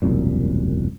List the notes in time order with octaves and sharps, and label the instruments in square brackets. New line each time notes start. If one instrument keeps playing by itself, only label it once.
[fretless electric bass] E1 C2 F#2 A#2